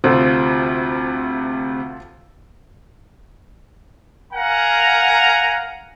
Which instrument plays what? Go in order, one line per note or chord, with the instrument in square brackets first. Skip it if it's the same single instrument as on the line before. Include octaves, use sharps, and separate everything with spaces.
[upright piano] D2 C3 [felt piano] F4 A4 C5
[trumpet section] A#4 F5 F#5 G#5 A#5